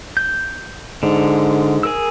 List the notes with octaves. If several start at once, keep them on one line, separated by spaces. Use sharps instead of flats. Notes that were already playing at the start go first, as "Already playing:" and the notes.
G6
G#2 D3
G#4 A#4 E6